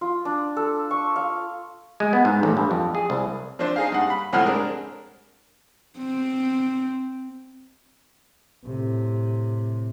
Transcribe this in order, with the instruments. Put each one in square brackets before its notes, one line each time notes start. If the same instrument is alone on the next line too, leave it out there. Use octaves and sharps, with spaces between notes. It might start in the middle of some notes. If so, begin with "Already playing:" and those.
[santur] F4
D4
A4
C#6
F5
[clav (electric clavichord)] G#3
B3
G#2
A1
G2
F2
G#4
C2
[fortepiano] F3 C4 D4 C5
D#4 G#4 F5
G2 F#5
B5
C2 A2 F3 F#5 D#6 F6
G#3 C4 D4 A#4
[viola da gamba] C4
[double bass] A2 C3